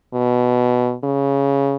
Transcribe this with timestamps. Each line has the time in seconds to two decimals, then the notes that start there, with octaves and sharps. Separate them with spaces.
0.14 B2
1.04 C#3